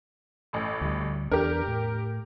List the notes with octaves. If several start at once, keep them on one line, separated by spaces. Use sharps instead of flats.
A1 A2
D2 G3
E2 D4 G4 A#4
A2